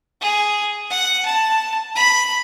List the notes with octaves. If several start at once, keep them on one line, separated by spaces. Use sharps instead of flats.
G#4
F#5
A5
B5